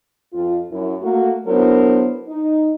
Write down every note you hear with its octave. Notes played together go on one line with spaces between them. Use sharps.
F2 F4
F#2 E4
A3 A#3 F#4
F#3 B3 D4 E4 A#4 C5
D#4